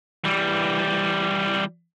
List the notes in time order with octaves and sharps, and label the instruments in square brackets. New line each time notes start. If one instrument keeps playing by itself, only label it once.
[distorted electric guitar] E3 G3